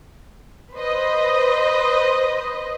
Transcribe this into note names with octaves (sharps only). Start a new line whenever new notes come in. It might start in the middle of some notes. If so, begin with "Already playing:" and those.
B4 C5 D#5